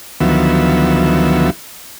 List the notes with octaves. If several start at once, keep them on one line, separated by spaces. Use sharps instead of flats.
D2 D#3 F3 F#3 B3 E5